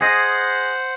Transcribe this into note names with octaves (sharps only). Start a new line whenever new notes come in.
G#4 C5 D#5 F#5